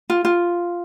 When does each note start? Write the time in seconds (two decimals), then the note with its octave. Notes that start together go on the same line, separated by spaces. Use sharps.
0.10 F4
0.25 F4